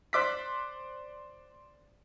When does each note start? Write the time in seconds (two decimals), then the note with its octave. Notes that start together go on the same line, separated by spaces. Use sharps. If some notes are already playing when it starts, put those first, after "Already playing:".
0.13 C5 D5 D6 F#6 B6